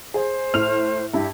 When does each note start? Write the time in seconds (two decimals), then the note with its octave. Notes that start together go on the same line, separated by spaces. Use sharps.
0.14 G#4 C5
0.54 A2 F6 F7
1.14 G2 E4 G4